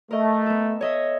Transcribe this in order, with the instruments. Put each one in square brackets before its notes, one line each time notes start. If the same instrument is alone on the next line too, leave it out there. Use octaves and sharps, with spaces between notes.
[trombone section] A3 [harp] A#4 D#5
[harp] B3 A4
C#5 D#5 E5